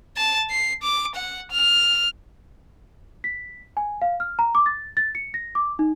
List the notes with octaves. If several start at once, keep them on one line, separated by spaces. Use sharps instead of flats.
A5
C7
D6
F#5
F6
B6
G#5
F5
F6
A#5
D6
A6
A6
C#7
A#6
D6
D#4